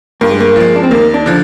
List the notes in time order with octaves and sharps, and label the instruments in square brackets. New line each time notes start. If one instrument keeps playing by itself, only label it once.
[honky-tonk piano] G2 [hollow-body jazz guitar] A#3
[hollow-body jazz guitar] G#3
A#3
[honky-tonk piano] F3 G#3
[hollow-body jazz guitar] D4
C4
[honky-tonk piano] D#2 [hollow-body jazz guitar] A#3
[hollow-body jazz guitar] D4
[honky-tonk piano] D3 F3